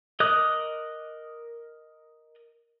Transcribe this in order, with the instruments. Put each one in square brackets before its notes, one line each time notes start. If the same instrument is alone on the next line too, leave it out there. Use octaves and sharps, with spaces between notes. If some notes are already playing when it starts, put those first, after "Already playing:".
[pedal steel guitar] A#4 D#5 D6 D#6 F#6